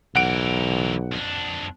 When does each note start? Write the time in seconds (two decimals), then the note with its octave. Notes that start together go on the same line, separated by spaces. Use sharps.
0.16 B1 E3 A#4 F#5 D7
1.12 F2 D4